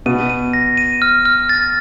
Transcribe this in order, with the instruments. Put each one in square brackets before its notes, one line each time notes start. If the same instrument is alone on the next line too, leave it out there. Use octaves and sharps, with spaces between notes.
[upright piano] B2 [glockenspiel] D#7
[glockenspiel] D#7
A#6
D#7
F6
F6
A6